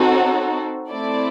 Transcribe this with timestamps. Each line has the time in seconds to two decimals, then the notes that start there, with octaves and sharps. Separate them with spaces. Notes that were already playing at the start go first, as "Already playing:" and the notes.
Already playing: C4 D#4 F#4 A4
0.11 C#5
0.89 A3 C4 E4 A4 D5